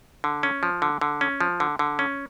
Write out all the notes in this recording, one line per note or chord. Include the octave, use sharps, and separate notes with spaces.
D3
C#4
F3
D3
D3
C#4
F3
D3
D3
C#4